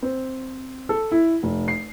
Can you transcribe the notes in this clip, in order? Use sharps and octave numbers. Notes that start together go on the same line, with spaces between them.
C4
A4
E4
F1
C7